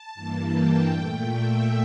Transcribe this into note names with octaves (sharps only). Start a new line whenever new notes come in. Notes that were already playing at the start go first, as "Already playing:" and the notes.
Already playing: A5
G2 E3 A#3
G5
A#2 A3
E5